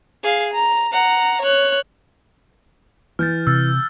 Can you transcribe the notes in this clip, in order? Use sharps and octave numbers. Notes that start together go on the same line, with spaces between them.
G#4 F5
A#5
F#5 A#5
C#5 F#6
E3 F6 G6 A6
C3 E6 A6